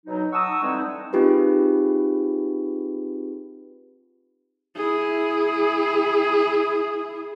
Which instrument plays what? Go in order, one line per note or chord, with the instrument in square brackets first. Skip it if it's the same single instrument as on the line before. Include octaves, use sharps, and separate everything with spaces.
[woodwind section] B2 F#3 D#4
F#5 A5 A#5 C#6 D#6 E6
D3 E3 G3 G#3 C4 D#4
[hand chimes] C4 D#4 F4 G4 G#4 B4
[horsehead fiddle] E4 G#4